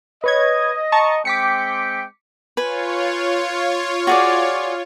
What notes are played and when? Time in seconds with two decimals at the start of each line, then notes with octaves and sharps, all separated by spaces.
0.24 B4 C#5 D#5 G#6
0.92 A5 A#5 C#6
1.25 G#3 C4 G5 D6 B6 C#7
2.57 F4 B4 C#5 G#5
4.07 F#4 G#4 D5